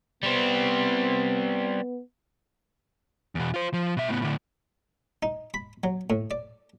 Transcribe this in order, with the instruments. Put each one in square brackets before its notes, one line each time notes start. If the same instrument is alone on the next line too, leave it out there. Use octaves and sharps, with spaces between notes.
[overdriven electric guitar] G3 C4 [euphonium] B3
[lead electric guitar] E2 B2
F4 C5
F3
B2 E5
A2 B3
A2 D3
[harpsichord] D#4
B5
F#3
A2
D5